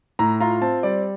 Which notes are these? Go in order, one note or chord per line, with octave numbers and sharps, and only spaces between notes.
A2 A#5
F4 A#5
C4 A5
G3 D5